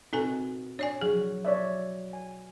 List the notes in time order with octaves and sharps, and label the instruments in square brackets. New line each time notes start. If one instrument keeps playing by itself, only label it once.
[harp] B2 F#4 [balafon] C4 A4 G#5 [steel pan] D#4
[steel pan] D4 [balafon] C#5 D5 G#5
[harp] F#3 [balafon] G#4
[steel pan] C#5 D5 E5
G#5